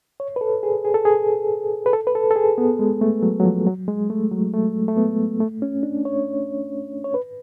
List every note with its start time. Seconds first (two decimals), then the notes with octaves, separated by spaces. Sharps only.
0.20 C#5
0.36 B4
0.41 A4
0.63 G#4
0.85 G#4
0.94 A4
1.05 G#4
1.86 B4
1.93 A4
2.07 B4
2.15 A4
2.31 A4
2.36 G#4
2.58 B3
2.79 G#3
3.01 A3
3.23 F#3
3.40 F#3
3.45 F3
3.67 F#3
3.88 G#3
4.10 A3
4.31 F#3
4.53 A3
4.88 A3
4.97 B3
5.41 A3
5.62 C#4
5.83 D4
6.05 C#5
7.04 C#5
7.14 B4